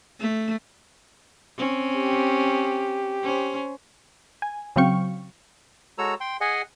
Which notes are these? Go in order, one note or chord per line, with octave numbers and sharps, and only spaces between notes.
A3
C4 C#4
G4
C#4 C5
G#5
C#3 F#3 C4 F5 G5 C#6
G#3 F#4 A4 C#5 A#5 E6
G5 C6
G#4 D#5 F#5 G#5